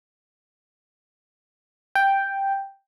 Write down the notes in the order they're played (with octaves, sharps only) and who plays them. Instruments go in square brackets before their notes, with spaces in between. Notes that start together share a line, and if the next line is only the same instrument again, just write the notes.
[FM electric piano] G5